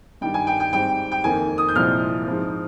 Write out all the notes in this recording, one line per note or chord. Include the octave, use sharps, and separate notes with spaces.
G2 D#3 G3 G5
G#5
G5
G5
G#2 G3 C4 G5
G5
F2 D#3 A#3 G#5
D#6
G6
C2 A#2 F3 G#3 C4 F6
G#2 F3 C4